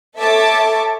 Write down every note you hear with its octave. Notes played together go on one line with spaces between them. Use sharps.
A4 C#5 E5 A5 D6